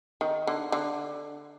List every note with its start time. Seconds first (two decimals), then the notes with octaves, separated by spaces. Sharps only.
0.21 D#3
0.47 D3
0.72 D3